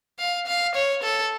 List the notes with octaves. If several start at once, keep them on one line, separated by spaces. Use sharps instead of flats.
F5
F5
C#5
A4